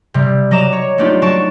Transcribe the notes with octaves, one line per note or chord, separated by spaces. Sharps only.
C3 G3
F#3 D#5 A#5 D6 E7
C#5
A3 A#3 D4 D#4 F4 G4
F#3 A5 C#6 A6 D7